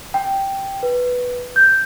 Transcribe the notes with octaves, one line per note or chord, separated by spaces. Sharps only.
G5
B4
G6